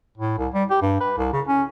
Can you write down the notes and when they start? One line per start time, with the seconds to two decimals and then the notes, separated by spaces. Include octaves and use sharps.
0.17 A2
0.38 C2
0.54 G3
0.70 G4
0.82 G2
1.00 B4
1.17 C2
1.33 C#3
1.47 C#4